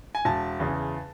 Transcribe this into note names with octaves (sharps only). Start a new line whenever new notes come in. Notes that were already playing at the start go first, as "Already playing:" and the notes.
G#5
E1 A5
E2 C#3